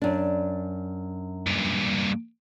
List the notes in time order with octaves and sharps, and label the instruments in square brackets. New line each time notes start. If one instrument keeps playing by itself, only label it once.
[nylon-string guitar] F#2 D4
[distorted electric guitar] G2 A#2